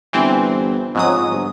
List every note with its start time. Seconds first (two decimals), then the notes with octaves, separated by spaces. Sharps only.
0.13 G1 E3 C4
0.95 F2 G#2 F#3 D#6
1.31 G1